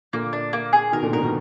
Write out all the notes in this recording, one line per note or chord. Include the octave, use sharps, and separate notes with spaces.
A#2 D3 A#3
D4
A#3
G#4
B2 D#3 A#4
A#2 D3
G#2 B2 A#4
B2 D#3